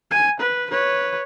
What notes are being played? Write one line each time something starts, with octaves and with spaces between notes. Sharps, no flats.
G#5
B4
B4 C#5